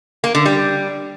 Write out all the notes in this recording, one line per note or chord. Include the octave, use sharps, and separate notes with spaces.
A#3
D3
G3